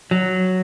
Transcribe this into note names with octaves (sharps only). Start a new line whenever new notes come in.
F#3